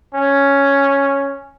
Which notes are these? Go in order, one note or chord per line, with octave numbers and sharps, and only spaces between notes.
C#4